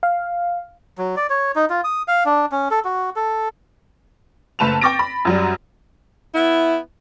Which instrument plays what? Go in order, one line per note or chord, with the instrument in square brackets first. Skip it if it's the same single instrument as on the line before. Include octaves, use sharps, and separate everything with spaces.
[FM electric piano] F5
[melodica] F#3
D5
C#5
D#4
F4
D#6
F5
D4
C#4
A4
F#4
A4
[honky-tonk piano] F#1 A3 B4 A5 E7 F7
G5 C#6 D6 A6 A#6 D7
B5
F#2 F#3 G3
[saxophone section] B3 E4